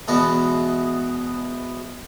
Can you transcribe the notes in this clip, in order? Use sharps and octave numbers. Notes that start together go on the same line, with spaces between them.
E2 B2 G#3 B3 D5